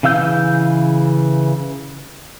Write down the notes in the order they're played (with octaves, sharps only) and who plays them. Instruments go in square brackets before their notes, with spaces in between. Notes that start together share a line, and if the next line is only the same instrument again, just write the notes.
[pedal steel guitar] C#3 E3 F5 E6 G6